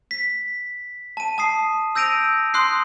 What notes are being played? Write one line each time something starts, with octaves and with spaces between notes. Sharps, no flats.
B6
A5 D#7
A5 D#6 C7
E6 G6 A#6 D7 D#7 F7
C6 D#6 F#6 C7